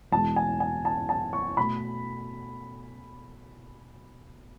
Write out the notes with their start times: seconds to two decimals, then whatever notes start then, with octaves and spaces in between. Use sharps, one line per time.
0.12 E2 B2 G#3 A5
0.36 G#5
0.60 G#5
0.85 A5
1.09 A5
1.33 C#6
1.57 B2 A3 B5